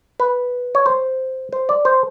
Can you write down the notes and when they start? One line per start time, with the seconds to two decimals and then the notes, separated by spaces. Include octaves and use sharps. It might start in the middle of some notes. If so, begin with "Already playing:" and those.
0.20 B4
0.75 C#5
0.86 C5
1.53 C5
1.69 D5
1.85 C5